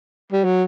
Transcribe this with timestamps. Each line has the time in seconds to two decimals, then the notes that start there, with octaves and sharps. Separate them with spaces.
0.32 G3
0.44 F#3